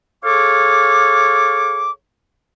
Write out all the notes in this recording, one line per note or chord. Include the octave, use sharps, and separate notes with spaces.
G#4 A4 C#5 F5 D6